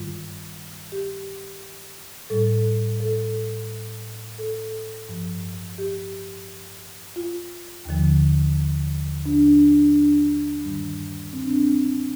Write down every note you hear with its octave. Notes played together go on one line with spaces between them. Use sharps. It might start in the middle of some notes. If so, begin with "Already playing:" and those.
Already playing: G2 D#3 G3 F4
G4
A2 G3 A4
A4
A4
G2 F3
G4
F4
D#2 D3 F3
D4
D4
D4
D4
G2 D#3 G3
C4
D4
C4